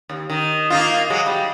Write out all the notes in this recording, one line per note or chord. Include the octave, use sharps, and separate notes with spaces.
D#2
D#3
A#3 D#4 F4
F#3 G#3
G3